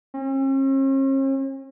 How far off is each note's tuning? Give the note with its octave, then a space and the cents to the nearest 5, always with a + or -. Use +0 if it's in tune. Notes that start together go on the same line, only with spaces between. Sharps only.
C#4 -45